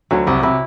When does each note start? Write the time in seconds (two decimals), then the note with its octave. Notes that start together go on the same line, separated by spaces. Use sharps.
0.11 D2 D3 F#3
0.27 C2 C3 E4
0.43 C3 E4